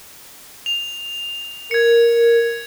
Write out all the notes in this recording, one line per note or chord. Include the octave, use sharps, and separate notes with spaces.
F7
A#4 G#6 C#7